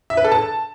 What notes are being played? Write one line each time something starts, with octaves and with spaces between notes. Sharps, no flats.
E5
B4
A4
A5